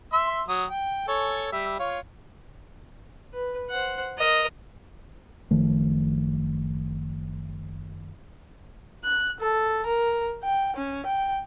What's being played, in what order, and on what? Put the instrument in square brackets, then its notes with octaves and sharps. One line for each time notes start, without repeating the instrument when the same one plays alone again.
[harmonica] E5 C6 E6
F#3 D#6
G5
A4 C#5 G#5
G3 E5
F4 C#5
[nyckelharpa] B4
C5 F#5
A#4 D#5
[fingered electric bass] F#1 D#3 F3 A3
[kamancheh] F#6
A4
A#4
G5
C#4
G5